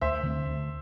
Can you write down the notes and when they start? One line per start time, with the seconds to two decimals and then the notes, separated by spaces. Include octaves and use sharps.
0.01 D2 C5 E5
0.23 D3 A3 C4
0.46 D2